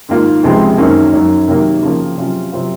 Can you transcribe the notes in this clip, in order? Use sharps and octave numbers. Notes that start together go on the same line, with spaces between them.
G#2 D#3 A#3 F4
C#2 C3 F3 G#3 C4
F#2 D#3 F#3 A#3 C#4
F#2 D#3 F#3
C3 D#3 F#3 A#3
C#3 F3 A#3
C3 F#3 C#4 F4
C3 F#3 C4 F4